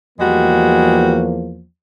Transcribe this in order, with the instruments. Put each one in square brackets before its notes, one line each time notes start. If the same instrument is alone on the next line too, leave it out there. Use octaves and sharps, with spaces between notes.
[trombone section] E2 F3 A#3 [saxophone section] G3 G#3 F#4